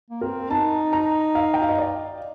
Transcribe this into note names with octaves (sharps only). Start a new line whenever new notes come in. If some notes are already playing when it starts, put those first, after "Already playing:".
A#3
C4 A#4
D#4 A5
A#5
F5
G5
F5
D#5
D5